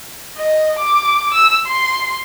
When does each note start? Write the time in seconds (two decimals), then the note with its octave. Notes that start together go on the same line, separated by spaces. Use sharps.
0.37 D#5
0.79 D6
1.34 E6
1.67 C6